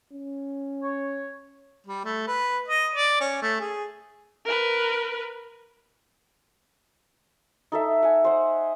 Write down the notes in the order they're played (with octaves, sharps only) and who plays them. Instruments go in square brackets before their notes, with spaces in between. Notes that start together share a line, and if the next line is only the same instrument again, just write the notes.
[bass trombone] C#4
[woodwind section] C#5
[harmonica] G3
A3
B4
D#5
D5
C#4
A3
G#4
[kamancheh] A#4 B4
[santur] D#4 A4 E5
F#5 G#5
C5 F#5